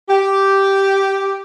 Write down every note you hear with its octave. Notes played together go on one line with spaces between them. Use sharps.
G4